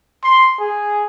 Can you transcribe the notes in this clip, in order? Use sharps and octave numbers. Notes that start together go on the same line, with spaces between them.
C6
G#4